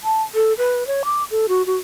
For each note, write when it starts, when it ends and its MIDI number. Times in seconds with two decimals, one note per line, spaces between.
0.04 0.22 81
0.34 0.53 69
0.58 0.86 71
0.87 1.02 73
1.05 1.23 86
1.31 1.46 69
1.48 1.65 66
1.66 1.77 66